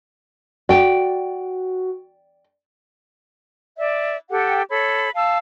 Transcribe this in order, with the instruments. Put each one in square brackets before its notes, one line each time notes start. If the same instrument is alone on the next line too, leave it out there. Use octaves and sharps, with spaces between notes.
[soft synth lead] F#4 [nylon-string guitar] D5 G5
[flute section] D5 E5
G4 A4 F#5 G5
A4 C#5 B5
F5 A5 E6